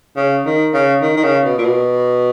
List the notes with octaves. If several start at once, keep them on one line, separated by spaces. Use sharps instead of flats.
C#3
D#3
C#3
D#3
D#3
C#3
B2
A#2
B2